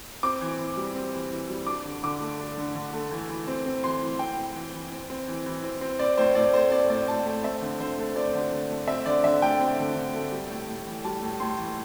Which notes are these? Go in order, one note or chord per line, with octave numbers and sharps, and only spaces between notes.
C4 D6
E3
E3
G3
C4
E3
E3
G3
D4 D6
D3
D3 D6
A3
D4
D3
D3
A3
E3
E3
C4
C4
E3 C6
E3
C4 G5
C4
E3
E3
C4
C4
E3
E3
C4
C4
C4 D5
A2 C5
A2 D5
A3 C5
C4 D5
A2 D5
A2 A5
A3
C4 E5
D3
D3 C5
A3
C4 D5
D3
D3
A3
C4 E5
D3 D5
D3 E5
A3 G5
C4
D3
D3
A3
G3
A2
A2
E3
G3 A5
A2
A2 C6
E3